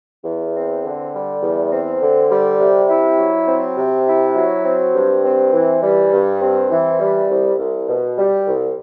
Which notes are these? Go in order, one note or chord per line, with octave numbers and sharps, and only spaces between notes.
E2
C4
D3
G3
E2
C4
D3
G3
C3
E4
F#3
C4
C3
E4
F#3
C4
G2
C4
E3
G3
G2
C4
E3
G3
C2
C2
B2
G3
C2